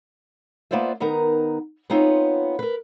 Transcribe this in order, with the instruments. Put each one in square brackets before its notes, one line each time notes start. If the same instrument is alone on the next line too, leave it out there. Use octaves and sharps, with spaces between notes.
[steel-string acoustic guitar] A#3 B3 F4 C5 D5 E5
D#3 B3 D#4 A#4
B3 C4 D#4 F4 C#5
A#4 B4